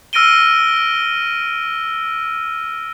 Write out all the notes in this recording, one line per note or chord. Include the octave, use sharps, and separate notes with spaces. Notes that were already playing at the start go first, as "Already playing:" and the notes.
E6 F6 A#6 D7 D#7 G7